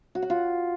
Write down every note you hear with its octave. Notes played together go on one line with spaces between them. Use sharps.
F#4
F#5
F4